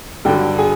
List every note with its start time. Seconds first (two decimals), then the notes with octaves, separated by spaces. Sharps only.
0.25 G2 D3 F#3 G4 G5
0.58 G#4 G#5